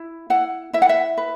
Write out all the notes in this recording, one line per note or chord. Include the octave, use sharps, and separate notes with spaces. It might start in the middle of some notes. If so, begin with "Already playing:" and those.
Already playing: E4
E4 F#5
E4 E5
F#5
E5
B4